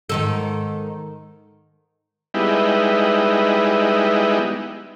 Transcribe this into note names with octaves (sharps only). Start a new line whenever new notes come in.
G#2 D#3 A4
G3 G#3 B3 D#4 E4